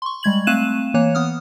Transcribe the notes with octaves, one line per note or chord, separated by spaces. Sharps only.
C6 C#6
G3 G#3 G#6 F#7
A3 C4 F5 F#6 D#7 E7
E3 A#3 C#5 F#6
B3 D#6 F6